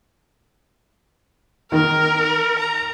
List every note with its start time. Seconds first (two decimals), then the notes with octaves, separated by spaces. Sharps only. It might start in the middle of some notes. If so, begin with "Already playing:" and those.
1.72 D#3 A#4
2.59 A#5